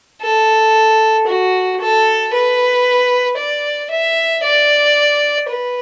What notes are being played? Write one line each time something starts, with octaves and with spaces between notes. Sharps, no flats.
A4
F#4
A4
B4
D5
E5
D5
B4